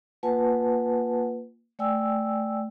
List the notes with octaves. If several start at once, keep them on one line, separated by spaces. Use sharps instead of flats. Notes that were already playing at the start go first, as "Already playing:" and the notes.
A#3 F4 B4 F#5 G#5 A5
A3 D5 G5 G#5 E6